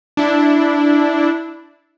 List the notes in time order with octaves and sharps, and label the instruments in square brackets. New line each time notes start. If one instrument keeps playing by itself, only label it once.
[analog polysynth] D4 E4